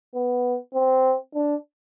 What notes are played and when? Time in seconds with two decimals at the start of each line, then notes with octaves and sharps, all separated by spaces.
0.15 B3
0.74 C4
1.34 D4